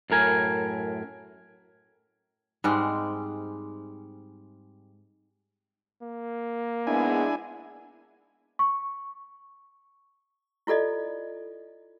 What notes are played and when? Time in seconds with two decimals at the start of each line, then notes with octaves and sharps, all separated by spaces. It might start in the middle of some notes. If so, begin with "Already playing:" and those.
0.10 F#2 A2 A#4 G#5
2.64 G#2 G3 G#3 C4
6.02 A#3
6.87 G#2 G#3 B3 D4 E4 G#5
8.59 C#6
10.67 E4 F4 A4 D5 D#5